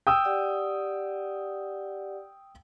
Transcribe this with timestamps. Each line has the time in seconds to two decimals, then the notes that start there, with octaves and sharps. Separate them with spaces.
0.07 G5 D#6 E6
0.24 G4 D5 F#5